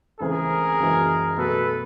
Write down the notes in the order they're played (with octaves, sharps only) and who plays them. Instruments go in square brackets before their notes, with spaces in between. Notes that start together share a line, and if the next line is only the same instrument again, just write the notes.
[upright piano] C#2 C#3 E3 A3 C4 [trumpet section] G#4 A#4
[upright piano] F#1 F#2 C#3 E3 G#3
[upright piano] B2 F#3 A3 [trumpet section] A4 B4